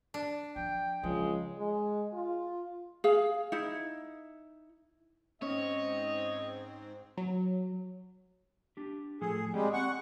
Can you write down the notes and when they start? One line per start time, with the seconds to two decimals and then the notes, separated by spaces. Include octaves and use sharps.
0.14 D4
0.56 F3 G5
1.03 C#2 F3 G#3
1.58 G#3
2.14 F4
3.04 G#4 F5
3.52 D#4 E4
5.42 G#2 C4 C#4 C#5 D#5
7.17 F#3
8.77 D4 G4
9.21 A2 F3 G#4 A4
9.54 G3 G#3 C4 G#4 G5
9.73 C4 F#5 C#6